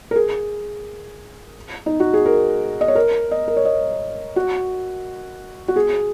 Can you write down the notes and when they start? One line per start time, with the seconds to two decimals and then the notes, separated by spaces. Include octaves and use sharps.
0.11 A#4
0.16 G#4
1.86 D#4
2.00 F#4
2.13 G#4
2.26 A#4
2.81 D#5
2.88 C#5
2.95 A#4
3.31 D#5
3.48 A#4
3.57 C#5
3.65 D#5
4.36 F#4
5.68 F#4
5.76 G#4